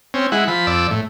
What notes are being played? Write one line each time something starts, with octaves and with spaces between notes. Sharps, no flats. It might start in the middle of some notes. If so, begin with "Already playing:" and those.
C4 C#4
G#3 E4 F#5
F3 B5
F2 D5 E6
A2